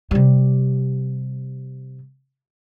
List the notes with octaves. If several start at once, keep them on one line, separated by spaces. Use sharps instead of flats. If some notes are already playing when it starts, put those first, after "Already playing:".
C3 G3